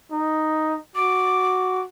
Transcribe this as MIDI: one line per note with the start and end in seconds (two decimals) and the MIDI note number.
0.11 0.76 63
0.96 1.84 66
0.96 1.81 86